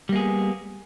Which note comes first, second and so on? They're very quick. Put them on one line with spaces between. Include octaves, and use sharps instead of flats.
G3 A#3 G#4 B3